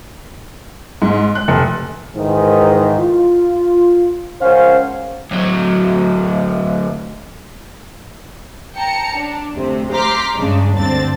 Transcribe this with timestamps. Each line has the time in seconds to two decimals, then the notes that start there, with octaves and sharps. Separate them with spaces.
1.02 G#2
1.35 F#6
1.48 F1
2.15 G#2 D#3 E3
3.00 F4
4.41 C#2 C#4 A#4 C5 F5 F#5
5.31 D2 F#3
8.75 G5 A5 A#5 C#7
9.17 D4
9.57 D2 C3
9.93 A#5 C6 D6 F6 G6 B6
10.36 G2 C#3 G#3 D4
10.75 D2 G2 C4 D4 A6